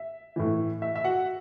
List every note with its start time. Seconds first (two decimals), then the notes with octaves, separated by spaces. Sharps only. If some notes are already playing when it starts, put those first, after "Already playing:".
Already playing: E5
0.36 A2 E3
0.82 E5
0.95 E5
1.04 F#4 F#5